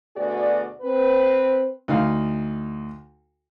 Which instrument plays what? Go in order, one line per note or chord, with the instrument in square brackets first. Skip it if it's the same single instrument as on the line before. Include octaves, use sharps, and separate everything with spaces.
[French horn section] D2 B2 F#4 G#4 D5
C4 B4
[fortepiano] D2 D#4 F5